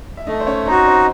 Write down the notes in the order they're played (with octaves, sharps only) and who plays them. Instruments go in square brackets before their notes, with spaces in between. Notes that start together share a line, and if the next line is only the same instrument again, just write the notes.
[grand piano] E5
[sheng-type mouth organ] A3 [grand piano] D#4 D#5
[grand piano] C5
C#4 C#5
[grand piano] C4 C5 [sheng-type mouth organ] D#4 F#4
[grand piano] C4 C5